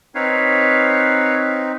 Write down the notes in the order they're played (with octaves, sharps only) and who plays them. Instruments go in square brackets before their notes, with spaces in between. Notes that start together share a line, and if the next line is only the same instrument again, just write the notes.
[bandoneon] C4 D#4 [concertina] B4 C#5 F5